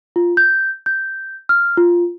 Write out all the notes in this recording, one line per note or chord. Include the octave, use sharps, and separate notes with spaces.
F4
G6
G6
F6
F4